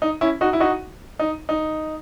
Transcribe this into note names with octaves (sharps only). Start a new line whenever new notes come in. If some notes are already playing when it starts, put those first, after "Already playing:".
D#4
C#4 E4
D#4 F#4
E4
D#4 F#4
D#4
D#4